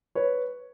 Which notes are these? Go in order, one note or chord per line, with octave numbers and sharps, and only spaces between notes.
B4 C#5